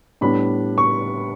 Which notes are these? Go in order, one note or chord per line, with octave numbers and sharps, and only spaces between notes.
A2 G3 B3 D4 B5
C#6